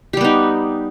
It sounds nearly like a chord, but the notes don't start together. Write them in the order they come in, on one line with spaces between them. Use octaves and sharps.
G4 G3 B3 D#4